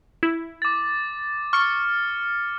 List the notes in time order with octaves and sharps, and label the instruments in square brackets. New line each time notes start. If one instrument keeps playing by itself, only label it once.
[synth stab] E4
[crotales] D6 A6
[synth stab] C#6 [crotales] F6 C#7